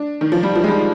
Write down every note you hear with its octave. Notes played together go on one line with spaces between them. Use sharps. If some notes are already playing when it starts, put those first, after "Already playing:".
Already playing: D4
D#3
F3
G3
F3
G#3
G3